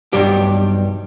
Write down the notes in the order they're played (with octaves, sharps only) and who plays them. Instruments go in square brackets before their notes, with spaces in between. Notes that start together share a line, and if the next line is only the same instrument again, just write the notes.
[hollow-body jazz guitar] B1 G2 G3 G4